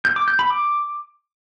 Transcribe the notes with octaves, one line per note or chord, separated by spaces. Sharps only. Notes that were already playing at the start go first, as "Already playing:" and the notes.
G6
D6
G6
B5
D6